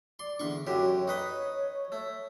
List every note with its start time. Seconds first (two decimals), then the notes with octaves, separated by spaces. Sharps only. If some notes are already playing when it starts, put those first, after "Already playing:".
0.19 D5 C6
0.39 E2 D3 C6 C#6
0.67 F#2 D3 G4 C#5
1.08 D#4 B4 D#5
1.92 A3